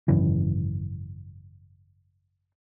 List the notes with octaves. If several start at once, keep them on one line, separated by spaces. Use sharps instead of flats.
G#1 F#2 C#3 E3